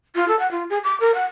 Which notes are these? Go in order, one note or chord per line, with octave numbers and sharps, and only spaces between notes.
F4
A4
F#5
F4
G#4
D6
A#4
F#5